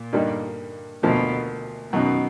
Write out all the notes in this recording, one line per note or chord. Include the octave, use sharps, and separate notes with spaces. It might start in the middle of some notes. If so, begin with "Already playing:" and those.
Already playing: A#2
G2 D3 G3 A#3 D#4
D2 B2 D3 F3 A#3
F#2 B2 D#3 F#3